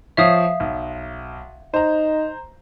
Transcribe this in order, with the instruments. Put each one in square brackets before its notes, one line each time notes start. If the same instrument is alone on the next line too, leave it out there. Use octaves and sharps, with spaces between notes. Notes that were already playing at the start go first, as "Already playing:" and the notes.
[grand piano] F3 C#5 [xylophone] E5 F5 D#6
[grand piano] B1
[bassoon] D#4 [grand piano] C5 A#5